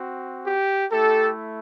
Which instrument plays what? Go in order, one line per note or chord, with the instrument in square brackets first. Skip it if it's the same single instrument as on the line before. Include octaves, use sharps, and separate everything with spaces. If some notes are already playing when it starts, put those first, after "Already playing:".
Already playing: [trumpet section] C4 F#4
G4
A3 E4 G4 A4